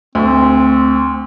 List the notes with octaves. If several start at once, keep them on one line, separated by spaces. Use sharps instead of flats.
D2 C4